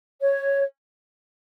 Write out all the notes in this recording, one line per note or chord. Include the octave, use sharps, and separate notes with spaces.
C#5